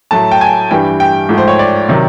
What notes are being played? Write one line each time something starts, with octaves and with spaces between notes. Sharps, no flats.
A2 F#3 A3 A5
G5
G#5
G2 E3 G3 G5
G5
G#2 F3 A3
C5
C#5
D5
C3 D#3 F#3